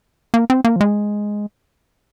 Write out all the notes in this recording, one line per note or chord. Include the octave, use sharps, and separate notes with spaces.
A#3
C4
A#3
F3
G#3